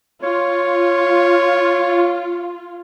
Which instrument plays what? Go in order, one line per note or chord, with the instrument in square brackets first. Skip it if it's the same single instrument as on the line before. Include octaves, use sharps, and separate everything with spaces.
[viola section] F4 [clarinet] C#5